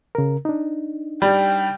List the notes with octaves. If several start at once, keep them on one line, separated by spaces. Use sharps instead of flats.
C#3 A#4
D4 D#4
G3 G5